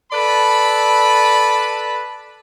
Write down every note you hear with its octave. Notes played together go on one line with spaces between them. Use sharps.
A4 B4 D5 A5 B5